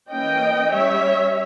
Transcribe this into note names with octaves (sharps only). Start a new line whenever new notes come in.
E3 A#3 C#4 D#5 G5
G3 C#4 C#5 E5